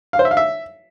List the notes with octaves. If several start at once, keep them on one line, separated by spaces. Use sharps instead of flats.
F5
C5
E5
F5
E5